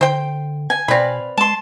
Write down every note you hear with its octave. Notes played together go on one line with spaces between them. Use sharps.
D3 C5 G5
G#5
B2 C4 B4 D5 F5 B5
G#3 A5 C6